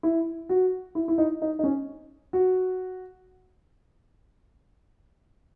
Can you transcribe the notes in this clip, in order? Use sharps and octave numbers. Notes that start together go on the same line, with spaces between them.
E4
F#4
E4
E4
D#4
D#4
D#4
C#4
F#4